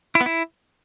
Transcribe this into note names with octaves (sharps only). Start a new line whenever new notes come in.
E4
B3
E4